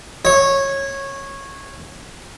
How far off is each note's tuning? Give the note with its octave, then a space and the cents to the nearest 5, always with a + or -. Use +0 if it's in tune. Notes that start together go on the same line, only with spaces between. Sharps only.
C#5 -15